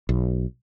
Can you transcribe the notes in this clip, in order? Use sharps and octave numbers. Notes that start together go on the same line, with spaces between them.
B1